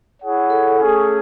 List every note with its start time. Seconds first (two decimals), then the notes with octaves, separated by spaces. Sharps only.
0.21 E4 G#4 C#5 F#5
0.50 A4
0.80 A3 C#4 G#4